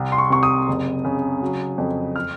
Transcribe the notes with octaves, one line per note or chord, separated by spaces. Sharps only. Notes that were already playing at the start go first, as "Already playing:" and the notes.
Already playing: C2
C6
C#6
C3 C#6
D#6
F#1
C#3
F#3
F2
F6